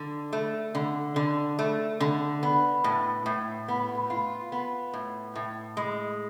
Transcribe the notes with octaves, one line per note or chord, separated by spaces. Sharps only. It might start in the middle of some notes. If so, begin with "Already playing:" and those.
Already playing: D3
A3
D3
D3
A3
D3
B3
A2
A2
B3
F4
B3
A2
A2
G#3